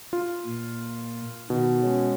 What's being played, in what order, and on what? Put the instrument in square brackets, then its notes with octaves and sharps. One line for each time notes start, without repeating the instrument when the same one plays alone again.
[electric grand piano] F4
[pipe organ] A#2
[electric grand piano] B2 [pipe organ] D#3
[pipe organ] G#3 C#4